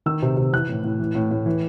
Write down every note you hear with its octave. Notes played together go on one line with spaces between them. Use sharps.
D#3 E6
C3
C3
E3 F#6
A2
A2
E3
A2
A2
E3